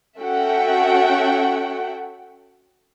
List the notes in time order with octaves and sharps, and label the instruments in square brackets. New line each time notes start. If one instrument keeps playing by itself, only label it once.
[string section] C#4 F#4 A4 E5 F#5 G5